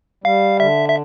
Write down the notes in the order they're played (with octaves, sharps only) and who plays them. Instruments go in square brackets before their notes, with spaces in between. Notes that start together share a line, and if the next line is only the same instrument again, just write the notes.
[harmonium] G3 [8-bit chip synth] F5
[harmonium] D3 [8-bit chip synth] E5
[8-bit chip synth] E5